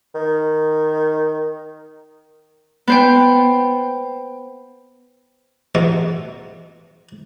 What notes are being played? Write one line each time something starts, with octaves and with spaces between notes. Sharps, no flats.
D#3
B3 C5 G5
A1 E2 B2